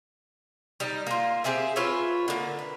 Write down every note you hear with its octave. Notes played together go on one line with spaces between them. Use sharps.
G3 D#4
A#3 F4
C4 G4 G#4 E5
F4 B4 C#5 E5
D3 A#3
B4